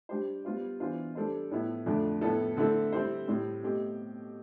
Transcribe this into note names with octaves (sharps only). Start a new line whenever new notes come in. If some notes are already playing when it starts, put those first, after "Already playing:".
G3 D4 G4 C5
G3 B3 F4 C5
E3 B3 D4 F4 C5
G3 D4 A4 C5
A2 F3 B3 E4
F2 D3 F3 A3 D4
A2 F3 B3 E4 A4
D3 A3 C4 E4 A4
G3 C4 E4 G4 C5
A2 G3 C4
B2 A3 C4 G4